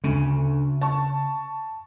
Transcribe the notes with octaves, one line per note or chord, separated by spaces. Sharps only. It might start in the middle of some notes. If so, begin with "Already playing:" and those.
D2 C#3
A5 C#6